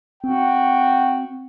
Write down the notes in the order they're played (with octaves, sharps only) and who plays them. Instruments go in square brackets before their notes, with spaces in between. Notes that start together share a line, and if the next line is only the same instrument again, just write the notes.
[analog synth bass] C4 [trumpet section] F#4 G5